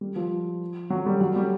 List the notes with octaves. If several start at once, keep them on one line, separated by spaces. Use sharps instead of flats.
G3
F3
F#3
G3
F#3
G3